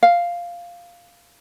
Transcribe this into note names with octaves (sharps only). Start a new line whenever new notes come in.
F5